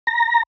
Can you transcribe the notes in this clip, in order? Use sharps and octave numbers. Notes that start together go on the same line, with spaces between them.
A#5